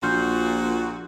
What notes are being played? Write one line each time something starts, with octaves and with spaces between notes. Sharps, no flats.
A#1 A#2 F#4 C6 F6 G6